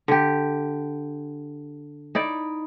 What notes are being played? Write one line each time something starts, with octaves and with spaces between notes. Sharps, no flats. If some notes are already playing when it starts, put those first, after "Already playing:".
D3 G4
D#4 E4 D5